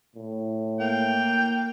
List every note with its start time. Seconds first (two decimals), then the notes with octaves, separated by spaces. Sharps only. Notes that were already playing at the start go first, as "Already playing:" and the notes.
0.15 A2
0.80 A#3 G5